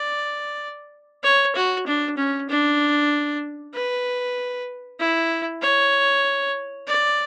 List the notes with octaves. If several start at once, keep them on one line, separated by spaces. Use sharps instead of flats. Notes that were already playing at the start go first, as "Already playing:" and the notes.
Already playing: D5
C#5
F#4
D4
C#4
D4
B4
E4
C#5
D5